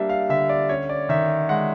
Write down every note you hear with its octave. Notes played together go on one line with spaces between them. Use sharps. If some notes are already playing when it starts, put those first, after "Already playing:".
Already playing: G3 A#3 D4 D5 E5
F5
D3 E5
D5
C#4 C#5
D5
D#3 E5
G#3 F#5